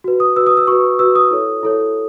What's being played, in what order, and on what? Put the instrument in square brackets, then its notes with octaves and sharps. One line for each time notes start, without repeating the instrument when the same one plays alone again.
[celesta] F#4 B4
D#6
F#4 B4 E6
D#6
E6
F#4 B4 C#6
F#4 B4 E6
D#6
E4 A4 C#5
E4 A4 C#5